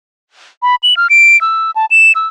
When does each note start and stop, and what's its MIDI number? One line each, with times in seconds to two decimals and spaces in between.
0.62 0.75 83
0.83 0.97 102
0.97 1.07 89
1.10 1.39 98
1.41 1.71 88
1.76 1.86 81
1.91 2.12 100
2.15 2.27 88